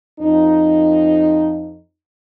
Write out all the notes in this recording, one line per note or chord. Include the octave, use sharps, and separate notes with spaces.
F2 D#4